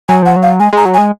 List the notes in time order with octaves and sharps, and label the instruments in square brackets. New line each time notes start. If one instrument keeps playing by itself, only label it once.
[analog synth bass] F#3 [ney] G#5
[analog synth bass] F3 [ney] F#5
[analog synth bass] F#3
[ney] F5
[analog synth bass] G#3 [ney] G#5
[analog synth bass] G#3 [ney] A#5
[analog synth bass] F#3
[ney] G#5
[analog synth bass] G#3